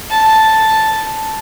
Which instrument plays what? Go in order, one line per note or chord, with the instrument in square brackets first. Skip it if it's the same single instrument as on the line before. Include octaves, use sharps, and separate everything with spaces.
[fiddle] A5